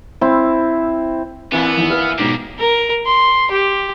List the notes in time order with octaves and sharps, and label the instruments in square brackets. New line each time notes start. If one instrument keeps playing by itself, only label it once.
[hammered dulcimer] C4 E4
[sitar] A#2 E3 E4 [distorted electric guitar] B3 [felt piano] C4 [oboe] D4
[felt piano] E2 D#3 E7
[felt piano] B4 [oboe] F5
[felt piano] B1 G#2 B2 [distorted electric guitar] A#3 D4 [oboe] G4
[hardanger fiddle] A#4
C6
G4